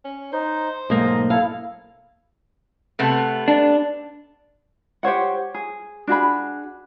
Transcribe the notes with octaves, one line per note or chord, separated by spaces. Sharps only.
C#4
D#4 C5
B1 G#2 A#3 D#5
E4 A4 F5
C3 A3 B3
D4
G4 C5 C#5 F#5
G#4
D4 F#4 G#4 B5